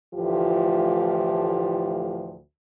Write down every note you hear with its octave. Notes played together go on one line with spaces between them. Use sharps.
D2 A2 E3 F3 F4 G4